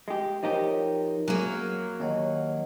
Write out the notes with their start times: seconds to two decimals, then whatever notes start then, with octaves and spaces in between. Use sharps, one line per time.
0.08 G#3 G4
0.43 F3 D#4 G4 A#4 C#5
1.28 F#2 F#3 A#3 G#4 A#4
2.00 D#2 C#5 D#5 F#5